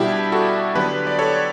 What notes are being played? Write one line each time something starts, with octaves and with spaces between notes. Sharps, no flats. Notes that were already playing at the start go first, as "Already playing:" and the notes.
Already playing: B2 G3 D4 E4 G4
F#4 A4
D3 F#3 B3 D4 G4 B4
D5
A4 C#5